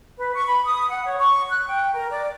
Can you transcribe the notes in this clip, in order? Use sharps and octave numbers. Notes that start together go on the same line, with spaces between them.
B4
C#6
B5
D#6
F#5
C#5
C#6
F#6
G5
A#4
D5